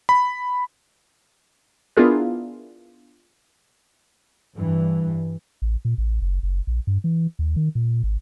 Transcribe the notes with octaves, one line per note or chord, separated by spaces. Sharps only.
B5
B3 D4 E4 F4 G#4 A#4
G2 E3
A1
A#2
A1
F#1
F#1
A#1
G2
E3
D#2
D#3
A#2
G#1